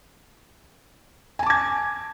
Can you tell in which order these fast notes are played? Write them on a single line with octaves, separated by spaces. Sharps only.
G#5 A5 D6 G#6